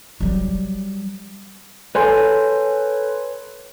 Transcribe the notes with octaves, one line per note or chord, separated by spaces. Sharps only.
F#3 G3
A4 B4 C#5 G#5 C6 G6